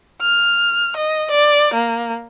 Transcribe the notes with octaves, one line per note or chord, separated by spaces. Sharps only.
F6
D#5
D5
A#3